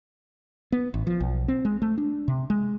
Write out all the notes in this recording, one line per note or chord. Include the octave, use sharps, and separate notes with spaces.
B3
A1
F3
B1
C4
G#3
A3
D4
C3
G#3